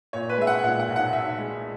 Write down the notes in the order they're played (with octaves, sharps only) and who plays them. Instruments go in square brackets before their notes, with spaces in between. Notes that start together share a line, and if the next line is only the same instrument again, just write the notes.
[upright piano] A#2 C#5
B4
G#3 E5
F#5
A#2 F#5
F#5
B1
F#5
B1 E5
G#3